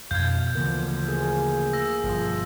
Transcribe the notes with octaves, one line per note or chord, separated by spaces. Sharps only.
F2 B2 F5 G6 G#6
D2 C#3 E3 F3 A#3 B3
A#3 G#4
E6 A#6
G1 B2 F3